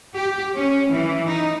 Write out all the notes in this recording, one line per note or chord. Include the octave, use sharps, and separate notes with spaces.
G4
C#4
E3
D#4